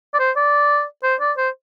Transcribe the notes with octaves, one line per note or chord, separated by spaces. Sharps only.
D5
C5
D5
C5
D5
C5